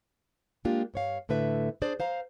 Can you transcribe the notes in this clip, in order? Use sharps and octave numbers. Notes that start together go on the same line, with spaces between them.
G#3 A#3 D4 F4 G4
G2 C#5 F5
A2 D3 A3 B4 E5
D4 G#4 C5 D5
C5 F5 A#5